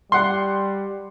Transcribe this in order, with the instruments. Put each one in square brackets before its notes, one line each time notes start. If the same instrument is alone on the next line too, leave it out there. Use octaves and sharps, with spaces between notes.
[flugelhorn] G3 [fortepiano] F#5 C6